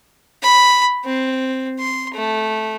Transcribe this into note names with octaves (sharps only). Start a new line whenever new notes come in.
B5
C4
C6
A3